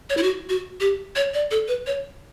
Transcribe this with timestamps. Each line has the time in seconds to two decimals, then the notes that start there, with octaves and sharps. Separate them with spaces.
0.10 C#5
0.17 E4
0.23 F#4
0.49 F#4
0.80 G4
1.16 C#5
1.34 D5
1.51 A4
1.68 B4
1.87 C#5